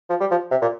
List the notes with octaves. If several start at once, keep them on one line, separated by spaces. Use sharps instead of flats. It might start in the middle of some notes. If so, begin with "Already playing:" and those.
F3
G3
F3
C3
A#2